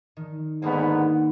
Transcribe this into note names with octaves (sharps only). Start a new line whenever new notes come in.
D#3
G#2 D3 A#3 B3 D#4